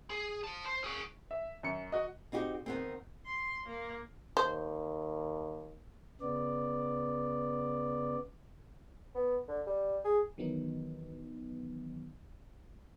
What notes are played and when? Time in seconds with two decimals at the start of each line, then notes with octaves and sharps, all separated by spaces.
0.10 G#4
0.44 C5 A5
0.65 C5
0.84 F#4 G#4
1.31 E5
1.63 F#2 C#7
1.92 F#4 D#5
2.32 C4 D#4 F#4 G4
2.66 D#3 B3 C4
3.26 C6
3.67 A#3
4.37 D#2 C5
6.21 C#3 B3 D5
9.15 B3
9.48 D3
9.67 G3
10.05 G#4
10.38 D#3 E3 F#3 B3 D#4